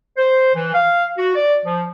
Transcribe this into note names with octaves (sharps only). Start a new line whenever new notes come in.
C5
E3
F5
F#4
D5
F3